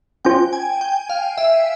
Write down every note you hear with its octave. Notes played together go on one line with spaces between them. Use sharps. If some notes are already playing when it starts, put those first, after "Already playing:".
C#4 F4 C5 G5
G#5
G5
F5
E5